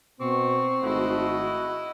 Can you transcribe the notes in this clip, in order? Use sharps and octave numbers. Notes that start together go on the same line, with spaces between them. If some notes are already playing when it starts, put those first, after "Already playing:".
B2 C4 C#6
G#1 A3 E4 F#4 D#5